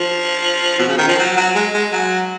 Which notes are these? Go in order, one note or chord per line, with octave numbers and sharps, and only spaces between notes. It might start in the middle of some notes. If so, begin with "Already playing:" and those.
Already playing: F3
B2
C#3
D#3
F3
F#3
F#3
G#3
G#3
F#3